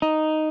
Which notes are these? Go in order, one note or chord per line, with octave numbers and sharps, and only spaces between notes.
D#4